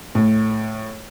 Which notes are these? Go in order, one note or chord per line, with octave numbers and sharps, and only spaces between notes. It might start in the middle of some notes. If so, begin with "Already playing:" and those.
A2